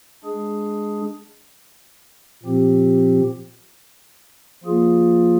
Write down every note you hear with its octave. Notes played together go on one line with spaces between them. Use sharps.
G#3 D4 G#4
A#2 F3 C4 G4
F3 A#3 F4 G#4